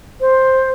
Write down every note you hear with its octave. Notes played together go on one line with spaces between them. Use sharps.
C5